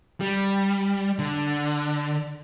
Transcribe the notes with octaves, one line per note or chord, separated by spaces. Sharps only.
G3
D3